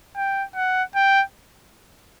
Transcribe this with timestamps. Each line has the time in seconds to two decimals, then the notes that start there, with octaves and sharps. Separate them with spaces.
0.17 G5
0.56 F#5
0.95 G5